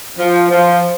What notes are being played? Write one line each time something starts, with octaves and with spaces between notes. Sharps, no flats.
F3
F3